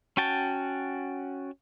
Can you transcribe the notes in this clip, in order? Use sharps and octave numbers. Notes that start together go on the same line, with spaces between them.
C#4 F#4 G5 A5